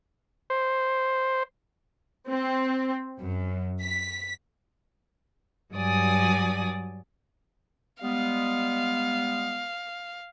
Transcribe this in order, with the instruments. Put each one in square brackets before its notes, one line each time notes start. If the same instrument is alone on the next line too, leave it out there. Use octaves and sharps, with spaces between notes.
[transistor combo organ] C5
[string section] C4
F#2
B6
[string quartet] G2 F#3 D5 G#5 D#6
[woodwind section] G3 G#3 B3 [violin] F5